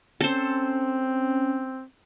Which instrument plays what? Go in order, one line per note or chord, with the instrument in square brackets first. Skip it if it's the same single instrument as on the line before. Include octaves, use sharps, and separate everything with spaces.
[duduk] C4 [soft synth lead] C#4 [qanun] A4 C5